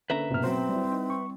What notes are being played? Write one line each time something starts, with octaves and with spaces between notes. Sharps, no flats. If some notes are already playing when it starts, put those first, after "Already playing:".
D3 A#3 C#4 B4 E5 A#5
F#1 B1 F#2 C3 F6
F#3 C4 F#4 C5
G3 E4
D#4
C#6